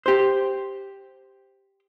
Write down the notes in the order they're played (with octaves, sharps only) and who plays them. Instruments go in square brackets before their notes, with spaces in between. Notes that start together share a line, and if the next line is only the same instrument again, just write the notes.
[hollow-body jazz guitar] G4 C5